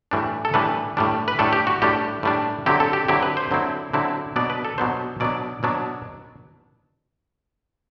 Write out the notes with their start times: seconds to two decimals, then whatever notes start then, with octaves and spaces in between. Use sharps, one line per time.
0.11 A2 E3 G3 D4
0.45 A4
0.54 A2 E3 G3 D4 B4
0.97 A2 G3 D4
1.28 B4
1.39 A2 G3 D4 A4
1.53 G4
1.67 F#4
1.82 A2 G3 D4 G4
2.23 A2 G3 D4
2.66 D3 F#3 C4 E4 G4
2.80 A4
2.93 G4
3.08 D3 F#3 C4 E4 G4
3.23 B4
3.37 C5
3.51 D3 F#3 C4 E4
3.93 D3 F#3 C4 E4
4.36 B2 F#3 B3 D4 D5
4.50 B4
4.65 A4
4.78 B2 F#3 B3 D4 C5
5.20 B2 F#3 B3 D4 D5
5.63 B2 F#3 B3 D4